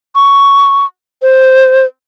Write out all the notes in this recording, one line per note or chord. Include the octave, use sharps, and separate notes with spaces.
C#6
C5